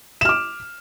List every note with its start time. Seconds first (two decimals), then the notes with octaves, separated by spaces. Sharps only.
0.21 E7
0.25 F6
0.29 D6